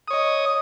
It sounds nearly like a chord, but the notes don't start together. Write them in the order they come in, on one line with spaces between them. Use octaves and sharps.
D#6 C#5 D#5